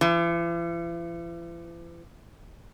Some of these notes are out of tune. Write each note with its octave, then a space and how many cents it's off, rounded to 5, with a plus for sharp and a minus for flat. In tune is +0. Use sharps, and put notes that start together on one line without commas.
E3 +45